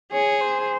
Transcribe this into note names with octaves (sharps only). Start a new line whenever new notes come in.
G#4 C#5
C5